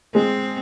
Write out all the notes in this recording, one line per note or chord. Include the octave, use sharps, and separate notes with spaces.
G#3 C4